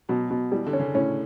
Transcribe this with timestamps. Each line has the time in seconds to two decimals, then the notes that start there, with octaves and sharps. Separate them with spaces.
0.09 B2 F#3
0.31 B2
0.52 E3 G3
0.67 D3
0.73 C#4
0.80 C#3
0.94 A2 C#4